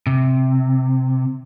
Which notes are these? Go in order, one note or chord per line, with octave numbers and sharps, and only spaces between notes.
C3